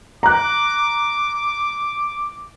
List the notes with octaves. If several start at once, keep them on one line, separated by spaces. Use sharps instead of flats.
A#5 D6 F#6